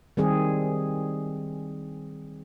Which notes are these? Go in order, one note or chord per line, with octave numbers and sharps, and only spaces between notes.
D#3 G3 C4 G#4